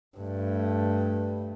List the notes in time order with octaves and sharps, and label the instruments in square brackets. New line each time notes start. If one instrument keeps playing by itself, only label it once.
[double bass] G2 A3